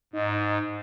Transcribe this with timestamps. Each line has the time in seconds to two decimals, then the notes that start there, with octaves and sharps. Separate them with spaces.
0.13 G#2 D#4